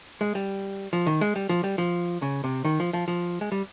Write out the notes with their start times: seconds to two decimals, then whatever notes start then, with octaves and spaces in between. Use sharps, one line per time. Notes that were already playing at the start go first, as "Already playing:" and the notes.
0.21 G#3
0.35 G3
0.93 F3
1.07 D#3
1.21 G#3
1.36 G3
1.49 F3
1.64 G3
1.78 F3
2.22 C#3
2.44 C3
2.65 D#3
2.80 F3
2.93 F3
3.08 F3
3.41 G#3
3.52 G3